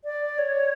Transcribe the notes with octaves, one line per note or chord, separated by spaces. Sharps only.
D5
C#5